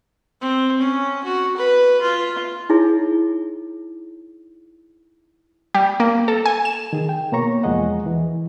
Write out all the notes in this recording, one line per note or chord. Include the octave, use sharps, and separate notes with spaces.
C4
C#4
F#4
B4
F4
D#4 E4 G#4 C#5
G3
A#3
A4
G#5
E7
D#3 G#4
G5
B2 A#3 C#5 A#5 C#6
E2 F3 G#3 G#4 D#5 F#5
E3